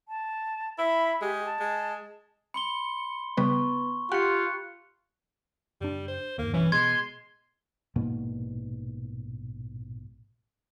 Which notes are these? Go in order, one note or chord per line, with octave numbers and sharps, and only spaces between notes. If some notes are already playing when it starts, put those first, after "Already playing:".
A5
E4 B5
G#3 G4
A5
G#3
B5 C6 C#7 G7
C#3 G3 B3 B4 C#6
F4 G4 F#5 F#6 C#7
F#1 G3 D4
C5
G1 D#2 A#3
B1 G2 E3 C#4
B2 G#3 C6 G#6
A#1 G#2 B2 A#3